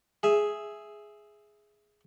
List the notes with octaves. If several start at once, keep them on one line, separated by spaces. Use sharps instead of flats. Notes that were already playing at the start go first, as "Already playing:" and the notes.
G#4 E5